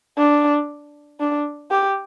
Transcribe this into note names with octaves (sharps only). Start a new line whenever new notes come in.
D4
D4
G4